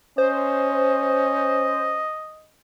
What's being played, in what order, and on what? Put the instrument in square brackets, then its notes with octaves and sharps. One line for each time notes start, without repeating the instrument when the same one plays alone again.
[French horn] C#4 [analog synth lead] C5 [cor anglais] D#5